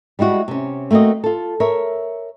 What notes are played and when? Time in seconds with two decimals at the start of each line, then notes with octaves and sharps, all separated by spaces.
0.19 G3 G#3 E4 F#4
0.48 C3 C#4
0.91 A3 A#3 C4 F#4 D#5
1.24 F4 A4
1.60 A#4 C#5 E5